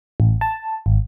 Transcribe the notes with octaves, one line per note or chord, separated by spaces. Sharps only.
A1
A5
G#1